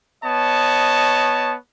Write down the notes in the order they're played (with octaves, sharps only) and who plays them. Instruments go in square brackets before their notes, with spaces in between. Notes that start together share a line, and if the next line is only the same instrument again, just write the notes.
[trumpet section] B3 C#5 D#5 A5